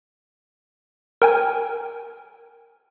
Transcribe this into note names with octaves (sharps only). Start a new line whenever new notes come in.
A#4 G5 G#5